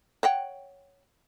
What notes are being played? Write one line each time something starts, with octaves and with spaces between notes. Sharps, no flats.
C#5 F#5 G5